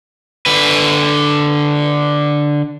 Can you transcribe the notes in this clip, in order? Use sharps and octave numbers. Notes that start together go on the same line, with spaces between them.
D3 B4